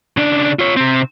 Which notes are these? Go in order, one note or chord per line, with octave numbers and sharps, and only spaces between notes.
C#3 D4
F4 C#5
C3 C4